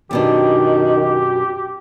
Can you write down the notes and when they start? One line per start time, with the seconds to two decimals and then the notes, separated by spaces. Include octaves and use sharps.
0.11 F#2 B2 D#3 D4 F#4 G4